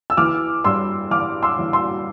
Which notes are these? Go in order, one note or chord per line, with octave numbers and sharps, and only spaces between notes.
E6
E3 D6 F6
G2 C6 E6
E3 D6 F6
C6 E6
E3
C6 E6